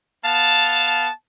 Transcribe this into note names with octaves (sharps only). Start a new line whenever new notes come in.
B3 F5 A5